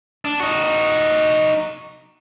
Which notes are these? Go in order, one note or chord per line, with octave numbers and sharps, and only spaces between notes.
D4
D#4 F#4